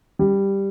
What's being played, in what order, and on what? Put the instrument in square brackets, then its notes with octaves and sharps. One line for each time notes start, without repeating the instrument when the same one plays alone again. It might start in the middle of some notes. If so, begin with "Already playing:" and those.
[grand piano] G3